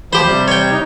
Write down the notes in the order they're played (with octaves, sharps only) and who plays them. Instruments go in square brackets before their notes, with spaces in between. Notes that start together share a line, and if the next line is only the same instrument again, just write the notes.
[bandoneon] D2 F3 B5 [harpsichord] G4 C5
[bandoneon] C3 G3
[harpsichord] C#5 G5
[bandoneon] D#4